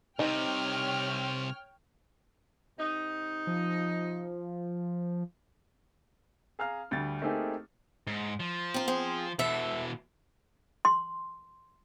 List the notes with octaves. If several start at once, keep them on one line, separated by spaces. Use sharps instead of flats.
C2 C3 C4 D#4 C#5 G5 F6
C3 D#4
F3
G#4 F5 A#5 F6
D2 G3 A6
A3 A#3 C4 D#4 G4 G#4
G#2
F3
C4 A#4
C4 G#4
B2 E3 A4 E5
C6